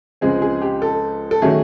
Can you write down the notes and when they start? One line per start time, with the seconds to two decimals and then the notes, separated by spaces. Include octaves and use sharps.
0.21 C#2 C#3 F3 G#3 C4 G#4
0.42 G#4
0.62 G4
0.82 A4
1.31 A4
1.42 D#3 F#3 A3 C#4 G#4